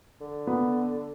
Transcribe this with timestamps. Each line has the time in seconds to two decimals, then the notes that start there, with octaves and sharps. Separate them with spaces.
0.20 D3
0.47 B3